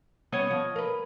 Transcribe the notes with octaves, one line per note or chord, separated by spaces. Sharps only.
G3 B3 C#4 C#5 D#5
F3
A#4 B4